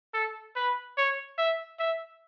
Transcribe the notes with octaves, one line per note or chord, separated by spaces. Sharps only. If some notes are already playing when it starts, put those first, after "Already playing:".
A4
B4
C#5
E5
E5